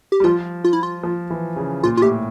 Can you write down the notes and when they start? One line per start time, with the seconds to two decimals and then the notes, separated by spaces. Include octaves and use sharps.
0.12 G4
0.20 G3
0.24 F3 F4
0.64 F4
0.73 E4
0.83 F4
1.03 F3
1.30 E3
1.56 C#3
1.83 A#2 F4
1.97 F4
2.02 A2 G4